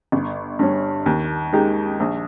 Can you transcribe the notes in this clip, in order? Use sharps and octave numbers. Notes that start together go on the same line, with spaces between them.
G1
G2 G3 C#4
D#2
D#3 G#3 D#4 G4
A#1